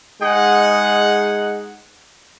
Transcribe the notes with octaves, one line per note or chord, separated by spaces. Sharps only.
G#3 D#4 G#4 F#5